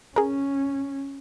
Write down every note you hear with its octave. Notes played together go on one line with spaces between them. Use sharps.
C#4 G#4 A#4